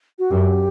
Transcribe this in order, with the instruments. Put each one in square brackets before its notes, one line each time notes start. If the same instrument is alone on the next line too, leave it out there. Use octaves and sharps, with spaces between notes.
[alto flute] F#4
[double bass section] F#2 [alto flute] G4